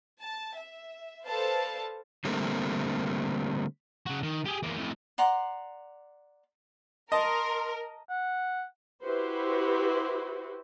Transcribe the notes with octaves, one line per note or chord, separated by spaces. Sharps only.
A5
E5
A4 B4 C5 D5 F5 A5
D3 G3 A3 A#3 C4
C#3 F#4
D#3
G4 G#4
E2 A#3
F2 A2
D5 F#5 A#5 C6
A#4 D#5 A5 C6
F#5
E4 F#4 G4 B4 C5